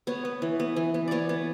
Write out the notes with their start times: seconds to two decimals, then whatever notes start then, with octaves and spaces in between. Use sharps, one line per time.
0.07 B3 C#5
0.25 B3
0.42 E3
0.60 B3
0.76 E3
0.94 B3
1.08 B3 C#5 D5
1.29 B3